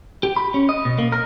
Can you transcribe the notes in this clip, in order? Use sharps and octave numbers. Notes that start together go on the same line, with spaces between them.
G4
B5
C#4
D#5
B2
A#3
A#4